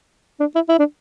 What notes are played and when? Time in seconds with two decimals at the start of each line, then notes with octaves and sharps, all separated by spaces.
0.40 D4
0.55 E4
0.69 E4
0.79 D4